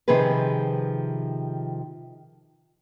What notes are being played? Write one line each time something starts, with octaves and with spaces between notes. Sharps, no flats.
C3 D#3 F3 G#4 B4